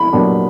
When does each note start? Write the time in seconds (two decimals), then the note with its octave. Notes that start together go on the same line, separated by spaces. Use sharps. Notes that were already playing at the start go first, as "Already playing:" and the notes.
Already playing: B5
0.13 A#2 F#3 B3 D4 G4